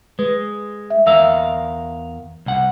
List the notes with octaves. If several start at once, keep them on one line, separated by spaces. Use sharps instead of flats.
G#3 B4
E5
E2 A#4 E5 F5 E6
C2 F#5